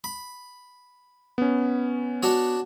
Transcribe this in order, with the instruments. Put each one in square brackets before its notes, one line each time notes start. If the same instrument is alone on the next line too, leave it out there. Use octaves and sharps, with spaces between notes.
[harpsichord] B5
[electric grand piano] B3 C#4
[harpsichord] D4 F#4 C#5